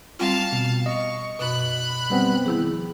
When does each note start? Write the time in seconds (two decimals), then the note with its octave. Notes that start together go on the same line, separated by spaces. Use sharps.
0.19 G3 C4 F4 F5 A5
0.52 B2
0.86 D#5 C#6
1.39 F#2 B2 B5 F#6
2.10 G3 B3 C4
2.46 D#3 F3 E4 G#4